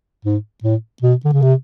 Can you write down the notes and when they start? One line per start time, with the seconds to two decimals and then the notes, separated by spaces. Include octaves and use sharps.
0.25 G#2
0.63 A2
1.02 B2
1.25 D3
1.33 C#3
1.42 C3